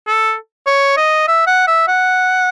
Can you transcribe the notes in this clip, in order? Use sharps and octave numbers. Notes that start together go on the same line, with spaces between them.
A4
C#5
D#5
E5
F#5
E5
F#5